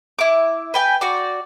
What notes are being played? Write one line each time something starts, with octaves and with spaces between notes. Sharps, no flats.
E4 D6
B4 G5 G#5
F#4 D5